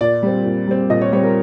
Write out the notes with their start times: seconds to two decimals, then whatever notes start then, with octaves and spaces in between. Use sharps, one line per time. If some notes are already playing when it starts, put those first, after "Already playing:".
0.01 A#2 D5
0.23 G3 C4
0.45 A#2
0.68 G3 C4
0.90 A#2 D#5
1.01 C#5
1.12 G3 C4 C#5
1.23 A#4